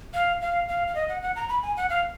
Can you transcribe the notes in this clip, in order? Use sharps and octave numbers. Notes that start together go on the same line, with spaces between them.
F5
F5
F5
F5
D#5
F#5
F#5
A#5
B5
G#5
F#5
F5